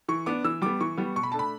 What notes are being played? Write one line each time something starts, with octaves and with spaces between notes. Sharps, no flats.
E3 C#6
B3 D4 D6
E3 E6
G3 B3 D6
E3 C#6
G3 B3
B2 C#6
B5
A3 D4 A5
B5